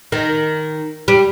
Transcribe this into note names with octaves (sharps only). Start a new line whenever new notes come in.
D#3
G3